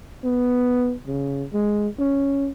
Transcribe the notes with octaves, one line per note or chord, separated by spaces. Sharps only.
B3
C#3
G#3
C#4